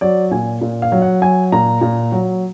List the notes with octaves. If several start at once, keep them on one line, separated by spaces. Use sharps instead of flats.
F#3 D5
A#2 G#5
A#2
F5
F#3
F#5
F#3 G#5
A#2 A#5
A#2
F#3